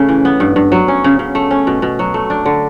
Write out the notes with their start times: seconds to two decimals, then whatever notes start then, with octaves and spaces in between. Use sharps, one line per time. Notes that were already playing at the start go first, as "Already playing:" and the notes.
Already playing: C#3 A3
0.09 E3
0.25 B3
0.40 G2
0.56 G2
0.72 F#3
0.88 C#4
1.04 C#3
1.19 C#3
1.35 A3
1.51 C#4
1.67 B2
1.82 B2
1.99 F#3
2.14 A3
2.30 D4
2.46 D3